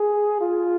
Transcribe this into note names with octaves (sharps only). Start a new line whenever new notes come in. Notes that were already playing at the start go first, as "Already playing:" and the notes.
Already playing: G#4
F4